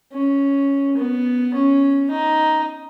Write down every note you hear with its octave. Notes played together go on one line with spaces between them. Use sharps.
C#4
B3
C#4
D#4